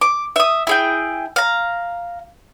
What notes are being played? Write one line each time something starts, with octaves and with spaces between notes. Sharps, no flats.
D6
E5 D#6
E4 G#4 G5
F5 A#5